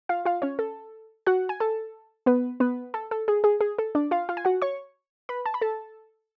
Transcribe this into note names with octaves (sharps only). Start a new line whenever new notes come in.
F4 F5
F4 F5
C#4 C#5
A4
F#4 F#5
G#5
A4 A5
B3 B4
B3 B4
A4
A4
G#4
G#4
G#4
A4
D4 D5
F4 F5
F4 F5
G#5
F#4 F#5
C#5 C#6
B4 B5
A5
B5
A4 A5